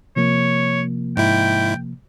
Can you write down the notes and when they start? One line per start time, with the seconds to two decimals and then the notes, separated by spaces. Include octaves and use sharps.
0.16 C3 F3 A#3 C#5
1.17 G#2 E4 G5